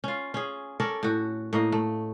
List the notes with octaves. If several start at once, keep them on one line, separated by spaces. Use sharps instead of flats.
C#4 F4
C#4 G#4
C#4 A4 A#4 D5
A2 F#4
A2 A#3 D#5
A3